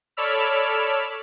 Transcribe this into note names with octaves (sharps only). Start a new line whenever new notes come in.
A4 C#5 D5 B5 E6 F6